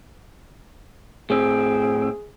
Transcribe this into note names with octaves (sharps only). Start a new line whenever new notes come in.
A2 C4 G#4